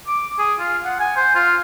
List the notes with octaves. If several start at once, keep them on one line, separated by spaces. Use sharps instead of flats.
D6
G#4
F4
F#5
G#5
C5
F4